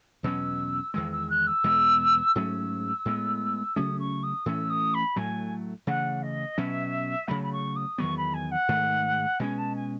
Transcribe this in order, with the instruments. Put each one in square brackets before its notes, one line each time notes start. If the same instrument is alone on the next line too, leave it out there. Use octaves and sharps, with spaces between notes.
[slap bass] E2 B2 F#3 C#4 [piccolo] E6
[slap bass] E2 D#3 G#3 [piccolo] E6
[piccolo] E6
F#6
E6
[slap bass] E2 B2 G#3 B3
[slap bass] G#2 F#3 A3 C#4 [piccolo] E6
[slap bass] A2 G#3 B3
[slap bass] C#3 F#3 A3 C#4 [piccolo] D#6
[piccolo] C#6
D#6
[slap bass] A2 E3 A3 C#4 [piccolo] E6
[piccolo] D#6
B5
[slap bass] A2 F#3 A3 [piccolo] G#5
[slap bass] C#3 E3 A3 [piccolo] F#5
[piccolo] D#5
[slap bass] B2 F#3 C#4 [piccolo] E5
[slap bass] C#3 F#3 A3 [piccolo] B5
[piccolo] B5
C#6
D#6
[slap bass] E2 D#3 F#3 B3 [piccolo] C#6
[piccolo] B5
G#5
F#5
[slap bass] G#2 D#3 A3
[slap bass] B2 G#3 C#4 [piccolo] G#5
[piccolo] A5
G#5